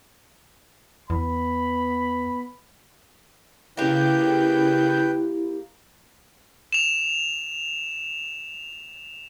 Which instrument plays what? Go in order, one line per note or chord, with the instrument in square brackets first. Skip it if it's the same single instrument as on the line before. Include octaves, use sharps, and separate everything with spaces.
[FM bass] E2 [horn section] B3 B5
[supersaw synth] C#3 G6 [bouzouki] A#3 G4 [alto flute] E4 [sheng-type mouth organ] B4 G5
[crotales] E7 F7